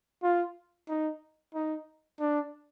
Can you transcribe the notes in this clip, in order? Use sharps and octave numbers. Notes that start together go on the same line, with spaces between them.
F4
D#4
D#4
D4